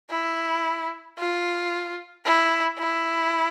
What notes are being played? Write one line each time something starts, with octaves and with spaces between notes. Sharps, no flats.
E4
F4
E4
E4